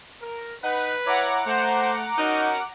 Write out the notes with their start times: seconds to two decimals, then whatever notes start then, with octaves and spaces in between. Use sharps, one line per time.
0.22 A#4
0.64 D#4 B4 F#5
1.06 E4 C#5 F#5 A#5 D6
1.46 A3 C5
2.18 C#4 D#4 F#4 A#4